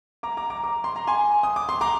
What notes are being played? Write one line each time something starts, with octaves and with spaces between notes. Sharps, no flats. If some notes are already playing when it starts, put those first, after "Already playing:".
A#5 D6
A#5 D6
A#5 D6
A#5 D6
C6
A#5
G#5 C6
D#6
D6
C6
A#5 D6